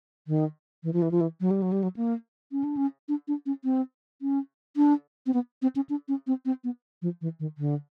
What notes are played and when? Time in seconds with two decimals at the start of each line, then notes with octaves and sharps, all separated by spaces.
0.27 D#3
0.83 E3
0.93 F3
1.02 E3
1.11 F3
1.21 E3
1.41 F#3
1.51 G3
1.62 F#3
1.72 G3
1.83 F#3
1.97 A#3
2.52 C#4
2.64 D4
2.77 C#4
3.08 D4
3.28 D4
3.46 C#4
3.64 C4
4.22 C#4
4.77 D4
5.26 C4
5.34 B3
5.62 C4
5.76 C#4
5.89 D4
6.08 C#4
6.27 C4
6.45 C4
6.64 B3
7.02 F3
7.21 E3
7.40 D#3
7.58 D3